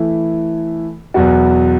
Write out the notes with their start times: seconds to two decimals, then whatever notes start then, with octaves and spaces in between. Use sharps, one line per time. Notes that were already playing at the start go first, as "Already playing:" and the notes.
Already playing: E3 A3 E4
1.14 E2 B2 F#3 B3 F#4